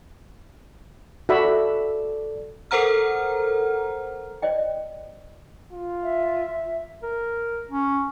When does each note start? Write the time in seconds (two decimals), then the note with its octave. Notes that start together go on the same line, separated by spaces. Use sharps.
1.29 F#4 A4 D5 E5 B5
2.71 A4 A#4 C5 F#5 A#5 F6
4.42 C5 D5 D#5 G5
5.72 F4
6.03 E5
7.03 A#4
7.70 C#4